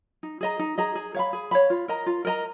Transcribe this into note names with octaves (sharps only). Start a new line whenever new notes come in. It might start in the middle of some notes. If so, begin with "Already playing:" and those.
D#4
G#4 D#5 A#5
D#4
G#4 D#5 A#5
G#4
C#5 F5 B5
G#4
C#5 F5 B5
F4
A#4 D#5 A#5
F4
A#4 D#5 A#5